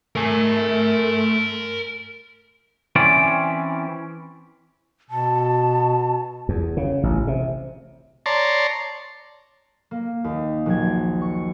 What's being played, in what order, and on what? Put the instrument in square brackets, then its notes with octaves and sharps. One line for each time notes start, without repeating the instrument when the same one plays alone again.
[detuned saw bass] A3 [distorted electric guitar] A#4 G#5
[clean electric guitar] E3 C4 C#4 D5
[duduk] B2 [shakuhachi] A5
[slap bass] E2
C#3
A1
C3
[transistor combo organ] C#5 D5 A5 A#5 C6
[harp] A#3
D#2
A#1 F#3 G#6
C#6